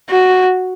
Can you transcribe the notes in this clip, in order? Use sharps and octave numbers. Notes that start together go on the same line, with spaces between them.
F#4